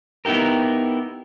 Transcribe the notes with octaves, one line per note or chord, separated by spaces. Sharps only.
B3 D#4 E4 G4 A#4